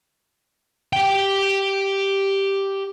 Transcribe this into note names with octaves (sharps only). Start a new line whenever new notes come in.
G4 G5